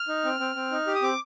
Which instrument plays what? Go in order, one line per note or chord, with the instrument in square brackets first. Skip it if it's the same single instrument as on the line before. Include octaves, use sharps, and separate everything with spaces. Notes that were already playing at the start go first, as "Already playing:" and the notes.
Already playing: [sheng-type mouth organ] F6
D#4
C4
C4
C4
D#4
G4
D#6
C4 D6